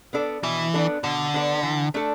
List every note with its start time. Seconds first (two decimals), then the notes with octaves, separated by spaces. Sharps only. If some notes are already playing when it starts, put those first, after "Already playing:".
0.13 B3 D4 A4 D5
0.43 B2 E3
0.74 B3 D4 A4 D5
1.03 B2 D3
1.34 B3 D4 A4 D5
1.63 E3
1.94 A3 D4 A4